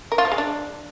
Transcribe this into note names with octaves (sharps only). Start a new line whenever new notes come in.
A#4
F4
F3
G#3
D4